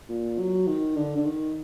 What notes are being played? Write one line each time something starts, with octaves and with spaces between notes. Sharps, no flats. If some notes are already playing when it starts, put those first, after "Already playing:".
A#2
F#3
D#3
D3
D3
D#3